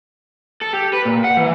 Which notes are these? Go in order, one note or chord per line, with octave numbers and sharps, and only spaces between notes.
A4
G4
B4
A#2
F#5
E3